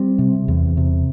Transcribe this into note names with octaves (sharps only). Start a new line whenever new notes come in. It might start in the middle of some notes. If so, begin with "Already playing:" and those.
Already playing: G3 C4
C3
E2
C3